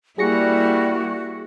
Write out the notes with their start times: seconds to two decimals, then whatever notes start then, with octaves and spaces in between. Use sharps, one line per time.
0.18 G3 A#3 E4 F#4 G#4 A#6 C#7